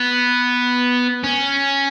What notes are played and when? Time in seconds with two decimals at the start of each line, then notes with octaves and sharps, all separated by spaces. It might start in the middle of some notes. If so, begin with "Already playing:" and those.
Already playing: B3
1.24 C#4